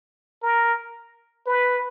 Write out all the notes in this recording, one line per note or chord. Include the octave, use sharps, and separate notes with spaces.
A#4
B4